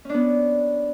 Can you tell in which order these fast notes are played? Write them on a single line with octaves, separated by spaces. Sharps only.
C#4 D4 B3